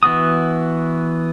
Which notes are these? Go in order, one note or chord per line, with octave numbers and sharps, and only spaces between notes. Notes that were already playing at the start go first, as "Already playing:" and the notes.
E3 B3 F#4 D#6